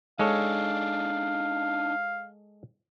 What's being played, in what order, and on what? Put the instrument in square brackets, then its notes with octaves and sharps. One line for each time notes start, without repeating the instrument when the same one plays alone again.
[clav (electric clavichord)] G#3 A4 C#5 [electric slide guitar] D4 D#4 [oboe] F5